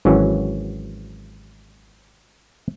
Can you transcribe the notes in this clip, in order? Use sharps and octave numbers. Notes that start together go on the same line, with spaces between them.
G#1 E3 F#3 C#4